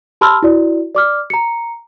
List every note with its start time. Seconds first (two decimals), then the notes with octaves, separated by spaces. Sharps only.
0.21 G4 A5 B5 C6 E6 F6
0.43 E4 F#4 D5
0.95 D5 D6 F6
1.30 A#5 C#7